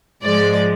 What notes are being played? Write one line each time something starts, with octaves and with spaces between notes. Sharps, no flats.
G#2 F3 G#3 D5